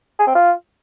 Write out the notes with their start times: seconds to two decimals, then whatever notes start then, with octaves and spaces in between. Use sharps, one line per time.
0.19 G#4
0.27 C4
0.35 F4